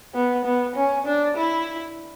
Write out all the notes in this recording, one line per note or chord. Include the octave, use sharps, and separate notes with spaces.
B3
B3
C#4
D4
E4